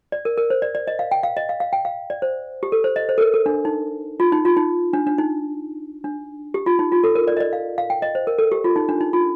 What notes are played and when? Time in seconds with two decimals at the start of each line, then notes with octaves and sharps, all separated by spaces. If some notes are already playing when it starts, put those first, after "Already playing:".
0.12 D5
0.25 A#4
0.37 A#4
0.50 C5
0.62 D5
0.75 D5
0.87 D#5
0.99 F5
1.11 G5
1.23 F5
1.37 D#5
1.49 F5
1.60 F5
1.73 G5
1.85 F5
2.10 D5
2.22 C5
2.63 G4
2.72 A4
2.84 C5
2.96 D#5
3.09 C5
3.18 A4
3.21 A#4
3.34 A4
3.46 D4
3.65 D#4
4.20 F4
4.32 D#4
4.45 F4
4.57 D#4
4.93 D4
5.07 D4
5.18 D#4
6.04 D4
6.54 G4
6.66 F4
6.79 D#4
6.92 F4
7.04 A4
7.15 A#4
7.28 D5
7.37 D#5
7.40 D5
7.53 F5
7.78 F5
7.90 G5
8.02 D#5
8.15 C5
8.27 A#4
8.38 A4
8.52 G4
8.64 F4
8.76 D#4
8.89 D4
9.01 D#4
9.13 F4